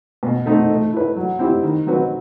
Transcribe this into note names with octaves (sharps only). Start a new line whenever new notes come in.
B2
A3 C4 D#4
A3
E4 B4
F#3
C4 E4 G4
D#3
F#3 C4 F#4 B4